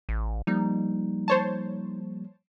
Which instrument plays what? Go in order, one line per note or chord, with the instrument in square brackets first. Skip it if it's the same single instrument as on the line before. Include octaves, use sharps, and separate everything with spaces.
[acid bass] A1
[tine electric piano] F3 G3 A#3 [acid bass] D#4
[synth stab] C5 C#5 A5